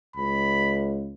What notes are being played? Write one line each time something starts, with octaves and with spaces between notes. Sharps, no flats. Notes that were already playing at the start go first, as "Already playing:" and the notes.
C#2 B5